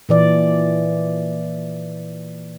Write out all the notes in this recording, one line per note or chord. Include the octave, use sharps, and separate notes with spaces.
A#2 E3 D5